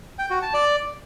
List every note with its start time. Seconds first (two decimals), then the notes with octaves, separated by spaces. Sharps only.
0.19 G5
0.30 F#4
0.42 A5
0.54 D5